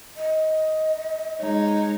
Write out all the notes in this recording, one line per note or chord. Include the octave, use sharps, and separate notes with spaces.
D#5
G#3 D#4 C#5